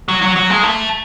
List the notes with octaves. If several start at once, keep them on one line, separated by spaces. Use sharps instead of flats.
F#3
F#3
F#3
G#3
A3